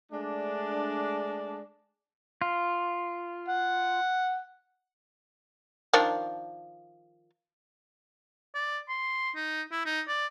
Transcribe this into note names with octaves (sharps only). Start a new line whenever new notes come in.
G#3 A3 D4
F4
F#5
D#3 F3 D4
D5
C6
D#4
E4
D#4
D5